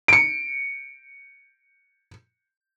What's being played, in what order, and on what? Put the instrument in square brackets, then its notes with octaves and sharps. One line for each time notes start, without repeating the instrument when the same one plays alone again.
[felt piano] C#7 D7